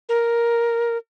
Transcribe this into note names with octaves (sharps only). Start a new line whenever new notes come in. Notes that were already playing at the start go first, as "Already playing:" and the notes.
A#4